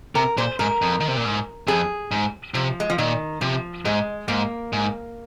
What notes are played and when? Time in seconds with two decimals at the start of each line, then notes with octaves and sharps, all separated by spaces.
0.15 C3 A#4
0.37 A#2 C5
0.59 G#2 A#4
0.82 F2
1.00 D#3
1.08 C3
1.16 A#2
1.25 G#2
1.67 F2 G#4
2.11 G#2
2.54 C3 F3
2.80 G#3
2.90 F3
2.98 A#2 D#3
3.41 C3 F3
3.85 G#2 G#3
4.28 G#2 A#3
4.73 G#2